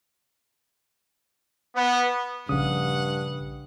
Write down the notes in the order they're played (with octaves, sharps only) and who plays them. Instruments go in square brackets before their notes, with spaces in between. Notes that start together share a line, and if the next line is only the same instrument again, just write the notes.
[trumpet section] B3
[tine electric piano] A#1 D#6 [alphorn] G2 [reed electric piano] C#3 [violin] F#5